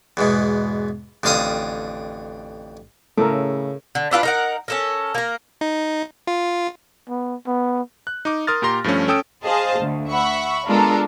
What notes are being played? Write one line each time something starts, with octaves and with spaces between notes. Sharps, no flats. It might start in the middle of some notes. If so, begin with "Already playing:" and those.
E2 G#2 B2
A1 F2 D3 F5 G5 D#6
A2 C#3 A4 A#4
D3
D4 E4 F4 B4
D#4 A#4 F#5
C#4 A4 A#4
A#3 A#4
D#4
F4
B3
B3
F#6
D#4 D6
A#4 C6 D#6 F6 A6
A#2 G4 A#5 C6 A#6
G2 F3 A3 C#4
C#4 A4 G5 D#6 E6 D7
G#4 C5 D#5 F5 A5
D2
E5 F#5 B5 C#6
G#3 B3 D4 F4 A4 A#4